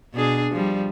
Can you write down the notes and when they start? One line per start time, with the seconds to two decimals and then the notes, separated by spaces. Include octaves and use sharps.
0.14 B2 D4 G#4
0.53 F3 G3